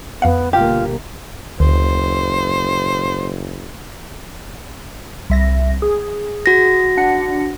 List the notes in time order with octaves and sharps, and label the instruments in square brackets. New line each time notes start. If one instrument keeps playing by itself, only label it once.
[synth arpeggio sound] F2 F5 F#5 [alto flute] B3
[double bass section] G1 B2 A#3 [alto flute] F4 [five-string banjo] G4
[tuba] F#1 [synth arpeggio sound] D2 [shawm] C5
[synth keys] C2 E5 A#6
G#4
[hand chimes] F#4 A#6
[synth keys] D4 F#5 C#7